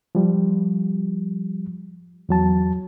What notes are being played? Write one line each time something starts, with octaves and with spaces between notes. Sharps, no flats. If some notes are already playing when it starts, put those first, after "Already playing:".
F3 G3
E2 F#3 A5